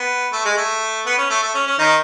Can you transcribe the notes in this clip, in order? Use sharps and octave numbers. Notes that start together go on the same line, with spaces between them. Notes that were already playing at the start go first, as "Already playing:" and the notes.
Already playing: B3
A3
G#3
A3
B3
C#4
A3
A3
C#4
C#4
D#3 D#4